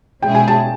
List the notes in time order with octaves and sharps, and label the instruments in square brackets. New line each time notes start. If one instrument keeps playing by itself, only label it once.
[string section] B2 G#3 C#4 E4 G#4 [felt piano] G5
[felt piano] G#5
A5